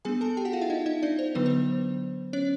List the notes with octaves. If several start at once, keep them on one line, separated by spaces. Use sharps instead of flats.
G3 B3 D4 G#4 G#5
A4 A5
G4 G5
F#4 F#5
F4 F5
E4 E5
D#4 D#5
D#4 D#5
D4 D5
C5
D3 F#3 B3 D4 B4
C5
C#4 C#5